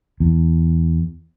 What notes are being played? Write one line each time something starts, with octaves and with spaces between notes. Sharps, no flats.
E2